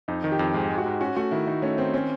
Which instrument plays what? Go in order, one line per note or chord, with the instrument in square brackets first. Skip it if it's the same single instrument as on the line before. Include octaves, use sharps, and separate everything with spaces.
[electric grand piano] F2 [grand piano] D#4
[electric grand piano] D#3
[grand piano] G4
[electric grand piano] F2
[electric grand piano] G#2 [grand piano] G#4
[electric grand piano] G#3
[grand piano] F#4
[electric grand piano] G#2
[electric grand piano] C#4 [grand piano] F#4
[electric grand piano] A3 [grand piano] F#4
[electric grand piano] D#3 [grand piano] E4
[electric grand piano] D#3 [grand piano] D#4
[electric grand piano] A3 [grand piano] C#4
[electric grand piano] D#3 [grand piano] C4
[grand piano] C4 [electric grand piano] C#4